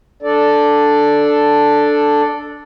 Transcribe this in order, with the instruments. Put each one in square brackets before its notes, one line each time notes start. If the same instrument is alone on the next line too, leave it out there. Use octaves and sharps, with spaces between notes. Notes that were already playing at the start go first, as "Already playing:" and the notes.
[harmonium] D4 A4 D5